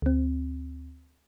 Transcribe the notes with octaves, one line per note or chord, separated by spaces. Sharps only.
D2 C4